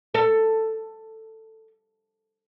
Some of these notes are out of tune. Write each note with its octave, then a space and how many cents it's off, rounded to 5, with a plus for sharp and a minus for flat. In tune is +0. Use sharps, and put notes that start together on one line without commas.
A4 +10